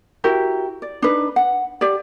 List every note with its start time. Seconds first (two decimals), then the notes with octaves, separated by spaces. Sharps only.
0.24 E4 F#4 G4 A#4
0.82 D5
1.02 D4 D#4 B4
1.36 F#5
1.81 G4 D5